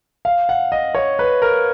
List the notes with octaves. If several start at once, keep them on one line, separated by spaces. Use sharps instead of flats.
F5
F#5
D#5
C#5
B4
A#4